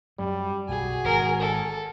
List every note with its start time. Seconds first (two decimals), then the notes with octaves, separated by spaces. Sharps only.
0.19 F#2 F#3 G3
0.69 B1 F#4 G#4
1.04 G#1 A#4
1.41 A4